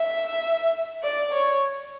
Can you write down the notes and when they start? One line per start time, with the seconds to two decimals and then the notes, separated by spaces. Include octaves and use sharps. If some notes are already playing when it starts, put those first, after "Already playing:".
Already playing: E5
1.03 D5
1.32 C#5